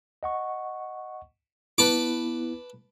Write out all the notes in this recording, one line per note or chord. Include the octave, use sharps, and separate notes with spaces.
D#5 F#5 C#6
B3 E4 B4 A5 D6